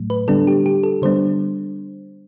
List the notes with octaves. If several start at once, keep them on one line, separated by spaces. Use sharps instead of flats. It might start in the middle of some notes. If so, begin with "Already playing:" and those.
Already playing: A2 F#3 A3
B4
D3 G3 B3 D4 A4
G4
G4
A4
D3 G3 B3 D4 C5